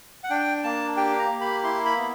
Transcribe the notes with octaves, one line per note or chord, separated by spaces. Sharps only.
F#5
D4 G5
A#3 A5
G4 G5
A#5
A#3
B5
E4 C6
B5
B3